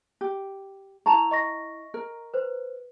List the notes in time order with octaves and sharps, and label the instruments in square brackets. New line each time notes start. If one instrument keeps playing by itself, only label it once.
[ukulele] G4
[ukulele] E4 A5 A#5 [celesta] C#6 F7
[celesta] D#5 C#6 A#6
[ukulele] A#4
[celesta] B4 C5